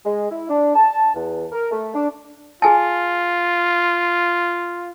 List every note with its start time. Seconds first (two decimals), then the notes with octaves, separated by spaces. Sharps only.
0.05 G#3
0.31 E4
0.50 D4
0.75 A5
1.15 E2
1.52 A#4
1.72 A3
1.95 D4
2.62 F4 G#4 G#5 A5